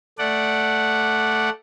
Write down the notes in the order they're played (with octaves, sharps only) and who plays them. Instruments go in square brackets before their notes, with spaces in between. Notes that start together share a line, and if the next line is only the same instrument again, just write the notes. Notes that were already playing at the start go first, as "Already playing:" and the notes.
[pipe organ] A3 D5 F#5